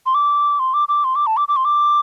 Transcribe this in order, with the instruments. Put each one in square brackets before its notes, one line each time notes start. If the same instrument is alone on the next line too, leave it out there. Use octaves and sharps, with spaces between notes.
[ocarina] C6
D6
C6
D6
D6
C6
D6
A5
D6
D6
C6
D6